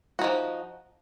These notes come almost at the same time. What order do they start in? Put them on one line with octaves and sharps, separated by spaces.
F#4 D#4 F3